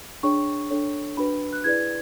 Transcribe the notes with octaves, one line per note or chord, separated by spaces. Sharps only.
D4 G#4 C#5 C#6
D4 A4 C#5
D4 F#4 B4 B5
F#6
E4 G#4 B4 D5 G#6